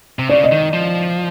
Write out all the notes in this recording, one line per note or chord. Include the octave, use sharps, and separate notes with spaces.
C3
C#3 D5
D#5
D#3
F3